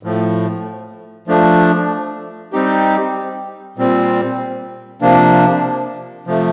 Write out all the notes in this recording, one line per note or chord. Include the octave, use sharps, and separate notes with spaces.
A2 F3 A3
F3 A3 D4
G3 C4 D#4 G4
A#2 G3 C4
C3 F3 A#3 D4
C3 F3 A3